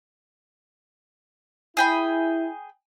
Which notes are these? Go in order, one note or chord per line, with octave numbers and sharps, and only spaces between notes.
E4 G#4 G5 B5